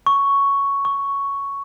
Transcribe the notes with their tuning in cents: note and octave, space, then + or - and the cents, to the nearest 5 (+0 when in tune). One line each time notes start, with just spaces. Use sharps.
C#6 +5
C#6 +5